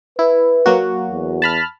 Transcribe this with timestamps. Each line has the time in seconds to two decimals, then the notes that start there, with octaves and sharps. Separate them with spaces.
0.19 E4 B4
0.66 F#3 A#3 F#4
1.11 E2
1.42 A5 B5 F6